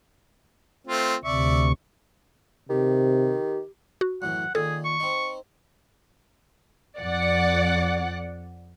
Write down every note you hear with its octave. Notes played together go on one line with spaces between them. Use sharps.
A3 C4 F4
D2 C3 D5 E5 C#6
C3 D#3 G4
F#4
F#2 A2 E3 F#5
A#2 D#3 G#4 A4
C#6
C4 D#4
F2 D5 F#5